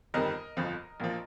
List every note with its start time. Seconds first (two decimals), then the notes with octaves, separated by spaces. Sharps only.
0.14 G1 F2 D#3 G3 A#4 D#5
0.57 G1 F2 F3
1.00 A#1 A#2 F3